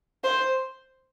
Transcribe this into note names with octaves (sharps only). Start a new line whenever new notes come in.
C5